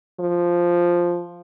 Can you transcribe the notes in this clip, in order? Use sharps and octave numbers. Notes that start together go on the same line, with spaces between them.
F3